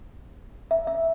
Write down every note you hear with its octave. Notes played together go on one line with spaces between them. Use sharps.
E5
E5